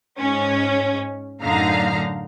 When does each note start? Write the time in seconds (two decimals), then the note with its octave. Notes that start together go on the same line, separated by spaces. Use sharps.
0.17 G#2 C#4
1.42 F#2 A2 D3 D#4 F5 A#5